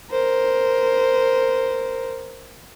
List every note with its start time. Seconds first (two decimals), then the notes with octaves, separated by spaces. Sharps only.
0.11 A#4 C5